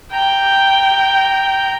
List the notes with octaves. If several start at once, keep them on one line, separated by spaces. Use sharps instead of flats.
G5 A#5 G6